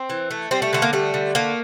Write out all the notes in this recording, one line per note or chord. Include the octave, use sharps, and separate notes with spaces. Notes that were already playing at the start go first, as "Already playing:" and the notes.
Already playing: C4
E3
A3
G3 C4
A3
D3 A3
A#3
G3 A3
D3
A3 A#3